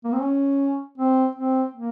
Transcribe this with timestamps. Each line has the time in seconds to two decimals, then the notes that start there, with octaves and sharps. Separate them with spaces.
0.04 A#3
0.12 C4
0.22 C#4
0.98 C4
1.35 C4
1.74 A#3